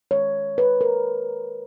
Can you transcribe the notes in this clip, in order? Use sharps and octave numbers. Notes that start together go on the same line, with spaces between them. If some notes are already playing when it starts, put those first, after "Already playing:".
D#3 G#3 C#5
B4
A#4